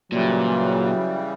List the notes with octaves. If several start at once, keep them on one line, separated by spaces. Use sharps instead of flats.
A#2 C#3 E3 F#3 G3